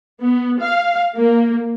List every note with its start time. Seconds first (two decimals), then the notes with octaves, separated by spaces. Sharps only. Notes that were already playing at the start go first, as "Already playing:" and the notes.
0.21 B3
0.61 F5
1.16 A#3